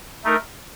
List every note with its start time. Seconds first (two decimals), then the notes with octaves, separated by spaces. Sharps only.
0.24 A3 D#4 A#4